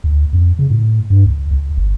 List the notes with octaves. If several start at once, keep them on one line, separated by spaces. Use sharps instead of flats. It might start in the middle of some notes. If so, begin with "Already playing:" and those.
D2
F2
C#3
A2
G2
C#2
C#2
G1